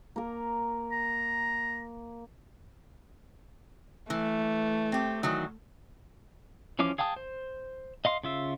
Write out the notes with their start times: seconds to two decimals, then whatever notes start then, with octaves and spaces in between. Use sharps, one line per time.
0.16 A#3 A#4
0.92 A#5
4.10 E3 A3
4.92 C4 G4
5.23 D#3 E3 F#3
6.79 E3 F3 C#4 F5 D6
6.98 G#4 F5 G5 A5 D#6
7.16 C5
8.05 D#5 F5 C6
8.24 C#3 F4 E5